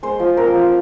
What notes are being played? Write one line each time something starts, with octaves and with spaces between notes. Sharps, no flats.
G#3 C5
F3
C4 A#4
F3